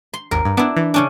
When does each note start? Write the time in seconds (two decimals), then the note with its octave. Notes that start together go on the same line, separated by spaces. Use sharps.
0.14 C6
0.31 G#1 D#2 A#4
0.45 G2
0.57 B3 D4 E4
0.77 E3
0.94 C#3 C#4 D4